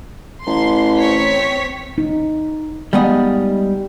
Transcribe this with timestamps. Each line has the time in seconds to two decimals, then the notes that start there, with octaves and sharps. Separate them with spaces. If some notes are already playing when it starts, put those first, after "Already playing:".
0.47 A1 C6
0.98 C4 C#5 B6
1.98 D#4
2.93 G3 G#3 B3 D#4 D#5 F5